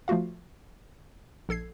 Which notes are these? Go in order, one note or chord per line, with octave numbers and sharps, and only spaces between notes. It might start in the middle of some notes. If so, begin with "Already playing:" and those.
F3 A3 F4 F#4 F5
A#1 A4 G#6 C7